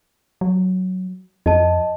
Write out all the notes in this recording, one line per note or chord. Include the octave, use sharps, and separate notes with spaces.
F#3
F2 D#5 A5